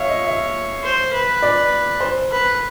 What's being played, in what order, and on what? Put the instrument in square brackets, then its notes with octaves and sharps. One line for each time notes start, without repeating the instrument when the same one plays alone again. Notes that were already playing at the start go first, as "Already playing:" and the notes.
Already playing: [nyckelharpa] C#5 [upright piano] E5 F5
[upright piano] D#5
E5
[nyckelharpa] C5
B4
[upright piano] D5
C5
[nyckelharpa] B4